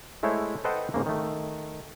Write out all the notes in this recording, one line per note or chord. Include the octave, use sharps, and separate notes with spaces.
G#3 A3 E4 C5 C#5
A4 B4 C5 D#5 F#5 G5
G#2 C#3 A#3
D#3 A3